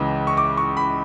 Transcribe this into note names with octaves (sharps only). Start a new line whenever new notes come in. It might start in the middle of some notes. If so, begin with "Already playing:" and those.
Already playing: C#2 C#3 E3 G#3
C#6
D6
C#6
B5